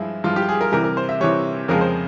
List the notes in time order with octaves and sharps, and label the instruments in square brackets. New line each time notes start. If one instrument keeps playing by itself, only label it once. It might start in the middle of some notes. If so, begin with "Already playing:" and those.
Already playing: [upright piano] G2 F3 G#3 E4
G2 F3 G#3 F4
G4
G#4
A#4
C3 E3 G3 A#4
A#4
C5
E5
C3 E3 G3 C#5
F2 C#3 F3 G#3 A#4
C5